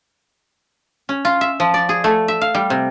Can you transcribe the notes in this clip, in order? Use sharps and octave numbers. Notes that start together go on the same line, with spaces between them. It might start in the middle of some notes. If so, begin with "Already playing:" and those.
C#4
F4
E5
F3
D5
G#4
A3
E5
F5
G3
C3